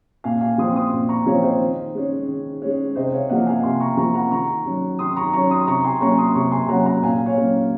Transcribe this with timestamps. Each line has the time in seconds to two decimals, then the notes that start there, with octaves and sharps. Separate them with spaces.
0.24 A#2 F5 G#5
0.41 F5 G#5
0.58 F3 C4 C6 D#6
0.76 C6 D#6
0.93 A#2
1.09 A#5 C#6
1.26 F3 C4 C#5 F5
1.43 C5 D#5
1.60 D#3
1.95 G#3 C#4
2.28 D#3
2.62 G#3 C#4
2.95 C3 C5 D#5
3.12 C#5 F5
3.29 F3 A#3 D#5 F#5
3.46 F5 G#5
3.64 C3 G#5 C6
3.80 A#5 C#6
3.97 F3 A#3 A#5 C#6
4.14 F#5 A#5
4.31 D#3 A#5 C#6
4.66 F#3 C#4
4.99 D#3 C6 D#6
5.16 A#5 C#6
5.33 F#3 C#4 A#5 C#6
5.50 C6 D#6
5.67 C3 A#5 C#6
5.84 G#5 C6
6.01 F#3 A#3 C#4 A#5 C#6
6.18 C6 D#6
6.35 C3 A#5 C#6
6.52 G#5 C6
6.68 F#3 A#3 C#4 F#5 A#5
6.86 F#5 A#5
7.03 A#2 F5 G#5
7.26 C#5 F5
7.37 F#3 A#3 C#4